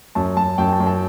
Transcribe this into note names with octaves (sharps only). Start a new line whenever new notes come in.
F#2 A5
F#2 A5
F#2 G5
A5
F#2
A5